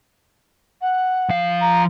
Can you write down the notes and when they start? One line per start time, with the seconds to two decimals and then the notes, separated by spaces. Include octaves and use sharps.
0.81 F#5
1.29 F3 F5
1.61 A#5